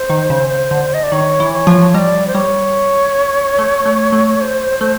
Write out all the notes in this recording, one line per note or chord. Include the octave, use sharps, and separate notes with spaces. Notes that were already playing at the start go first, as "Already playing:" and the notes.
Already playing: C5
D#3
C#3
D3
D#5
D5
D#3 C#5
E3
C#5
F3
G3 D5 D#5
C5
G3 C#5
A3
A3
A3
C5
A3